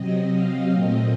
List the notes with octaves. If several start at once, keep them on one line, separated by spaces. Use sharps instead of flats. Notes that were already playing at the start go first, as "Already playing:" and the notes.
Already playing: C3 F#3 C4 D#5
F5
A#2 A3 C4 D#5